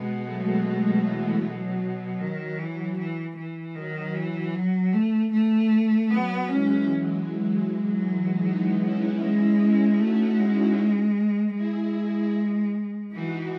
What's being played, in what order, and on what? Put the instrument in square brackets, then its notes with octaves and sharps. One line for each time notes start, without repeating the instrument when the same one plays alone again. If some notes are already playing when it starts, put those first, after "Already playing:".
Already playing: [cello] B2 [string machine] G#3 B3
[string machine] F#3 A3
F#3
E3 G#3
[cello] B2 [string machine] F#3
[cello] D#3 [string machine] F#3
[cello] E3
E3
E3
[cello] D#3 [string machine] F#3
[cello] E3
F#3
A3
A3
[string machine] F#3 [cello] B3
[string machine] E3 G#3 [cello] C#4
[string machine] F#3
[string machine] E3 G#3 [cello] F#3
[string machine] B3 D#4
C#4 E4
[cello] G#3 [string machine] C#4 E4
[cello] A3 [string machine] D#4 F#4
[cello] G#3
[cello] G#3 [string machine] E4 G#4
[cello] E3 [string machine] D#4 F#4